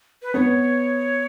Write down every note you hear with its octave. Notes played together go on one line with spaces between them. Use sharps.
B4
B3 B4 C#5